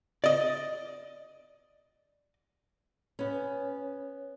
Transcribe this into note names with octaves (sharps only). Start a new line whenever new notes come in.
D5 D#5
B3 C#4